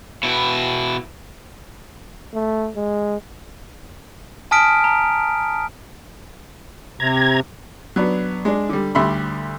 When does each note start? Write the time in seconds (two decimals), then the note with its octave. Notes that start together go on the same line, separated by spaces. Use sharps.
0.23 B2 E4
2.34 A3
2.76 G#3
4.51 G#5 A5 D#6 F6 B6 D7
4.84 A#5
7.00 C3 A#5 G#6
7.96 F#3 B3 D4
8.45 G#3 D4
8.69 D3 G3
8.95 D2 G3 E5 B5 C6